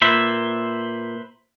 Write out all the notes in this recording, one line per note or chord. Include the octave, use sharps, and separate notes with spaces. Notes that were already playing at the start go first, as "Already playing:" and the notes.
A#2 B4 C5 E5